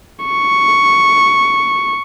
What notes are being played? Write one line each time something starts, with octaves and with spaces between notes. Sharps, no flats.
C#6